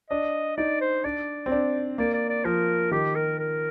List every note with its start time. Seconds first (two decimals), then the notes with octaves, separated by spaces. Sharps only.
0.10 D4 D#5
0.57 D#4 D5
0.81 C5
1.04 D4 D5
1.46 C4
1.52 D4
1.98 A#3 D5
2.14 D5
2.29 D5
2.45 F3 A#4
2.91 D#3 G4
3.16 A#4
3.39 A#4